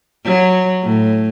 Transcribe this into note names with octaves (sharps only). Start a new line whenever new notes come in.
F#3
A2